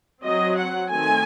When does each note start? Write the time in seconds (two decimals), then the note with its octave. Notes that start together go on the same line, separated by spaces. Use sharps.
0.22 F#3 C4 D#5
0.56 F#5
0.89 D#3 A3 C4 G#5